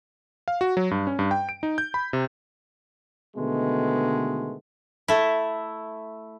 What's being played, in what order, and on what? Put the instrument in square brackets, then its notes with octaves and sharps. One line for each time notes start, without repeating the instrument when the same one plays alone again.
[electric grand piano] F5
F#4
F#3
G2
C#4
G2
G5
D7
D#4
G6
B5
C3
[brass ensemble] B2 D3 D#3 G#3 A3 B3
[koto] A3 E4